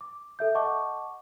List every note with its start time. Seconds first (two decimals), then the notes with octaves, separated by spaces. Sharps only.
0.01 D6
0.39 A4 E5 G6
0.55 D#5 F#5 A5 C#6 D6